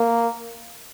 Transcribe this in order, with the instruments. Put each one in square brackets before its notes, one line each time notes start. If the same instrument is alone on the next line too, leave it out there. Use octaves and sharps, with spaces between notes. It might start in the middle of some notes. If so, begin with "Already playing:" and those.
Already playing: [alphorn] A#3